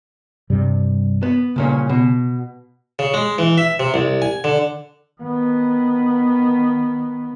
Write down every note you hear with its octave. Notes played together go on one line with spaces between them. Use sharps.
G2 C3 G3
B3
C2 A#2 C#3 C#4
B2
C#3
G#3
E3
E5
C3
C2
G#5
D3
D#3 B3